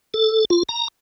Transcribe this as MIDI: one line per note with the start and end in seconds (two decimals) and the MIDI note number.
0.14 0.45 69
0.50 0.63 65
0.69 0.88 82